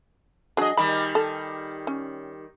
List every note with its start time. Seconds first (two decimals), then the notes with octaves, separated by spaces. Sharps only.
0.57 F#3 D4 G#4 D#5
0.77 D#3 G3 B5
1.15 A4
1.87 C#4